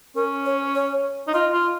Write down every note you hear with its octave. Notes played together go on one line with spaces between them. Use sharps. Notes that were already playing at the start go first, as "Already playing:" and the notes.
C#4 A#4
C#5
C#5
D#4
F4 D#5
F4